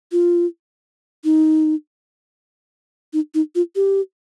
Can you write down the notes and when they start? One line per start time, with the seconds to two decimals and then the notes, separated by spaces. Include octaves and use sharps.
0.12 F4
1.24 D#4
3.13 D#4
3.34 D#4
3.55 F4
3.76 G4